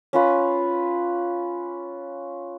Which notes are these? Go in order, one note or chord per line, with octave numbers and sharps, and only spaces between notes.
C#4 F4 B4